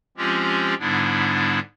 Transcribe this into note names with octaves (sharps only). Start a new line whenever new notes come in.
F3 G#3 C4 C#4 F4 G4
G#2 D3 G3 B3 D4 E4